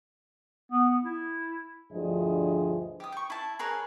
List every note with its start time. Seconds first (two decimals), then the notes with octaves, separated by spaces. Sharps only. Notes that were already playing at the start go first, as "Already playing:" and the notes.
0.72 B3
1.05 E4
1.92 D2 G2 F3 E4 G#4 D#5
3.00 G4 D#6
3.12 G5 C#6
3.30 E4 A5
3.59 G#4 A#4 B4 C#5